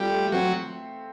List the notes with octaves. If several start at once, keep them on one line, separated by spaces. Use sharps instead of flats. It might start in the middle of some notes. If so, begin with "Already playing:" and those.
Already playing: G3 C4 F4 A4
A3
F#3 C4